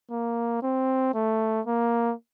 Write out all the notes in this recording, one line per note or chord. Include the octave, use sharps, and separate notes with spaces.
A#3
C4
A3
A#3